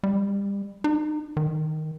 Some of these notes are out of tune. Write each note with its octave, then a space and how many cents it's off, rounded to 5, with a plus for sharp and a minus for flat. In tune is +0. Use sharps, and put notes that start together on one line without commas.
G3 +30
D#4 -35
D#3 +0